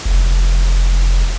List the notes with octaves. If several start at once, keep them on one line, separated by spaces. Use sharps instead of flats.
F1